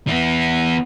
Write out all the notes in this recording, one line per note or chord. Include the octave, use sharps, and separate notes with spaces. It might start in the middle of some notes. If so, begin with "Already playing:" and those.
E3 B3